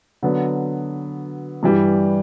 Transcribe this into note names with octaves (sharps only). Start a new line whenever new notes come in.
D3 F#3 B3
G2 E3 G3